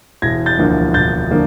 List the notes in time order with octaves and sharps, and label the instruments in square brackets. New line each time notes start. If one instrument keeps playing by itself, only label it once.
[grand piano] E1 G#6 A#6
G6 A6
D2 D3 F3 A#3
E1 G6 A6
D3 F3 A#3